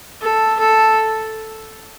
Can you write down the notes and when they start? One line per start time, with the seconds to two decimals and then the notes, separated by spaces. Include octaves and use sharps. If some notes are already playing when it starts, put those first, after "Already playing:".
0.22 A4
0.59 A4